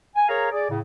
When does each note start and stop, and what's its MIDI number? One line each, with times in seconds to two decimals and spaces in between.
0.16 0.28 80
0.29 0.47 68
0.29 0.47 70
0.29 0.47 73
0.29 0.47 77
0.29 0.47 82
0.51 0.68 68
0.51 0.68 74
0.70 0.79 45
0.70 0.79 49